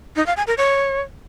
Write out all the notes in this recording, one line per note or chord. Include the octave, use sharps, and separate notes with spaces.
D#4
F5
G#5
A#4
C#5